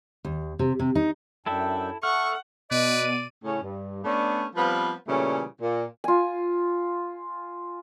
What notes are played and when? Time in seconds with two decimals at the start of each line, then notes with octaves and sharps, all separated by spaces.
0.25 D#2
0.59 C3
0.79 C3
0.95 D#4
1.46 F#2 D4 E4 A4 E5 G5
2.03 A4 E5 F#5 C#6 F6
2.71 B2 B4 D5 D#5 D#7
3.44 A2 C#3 C#4
3.63 G2
4.04 A3 B3 C#4 D4
4.56 F3 G3 B3 C4 B4 F5
5.07 A#2 C#3 E3 G3 A3 C#4
5.61 A#2
6.04 F4 G#5